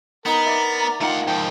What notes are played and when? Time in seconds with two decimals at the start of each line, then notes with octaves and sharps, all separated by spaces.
0.26 B3 D#4 A#4 A#5
0.46 D5 E5
1.01 D#3 A3 F4 F#5
1.28 G#2 F3 G5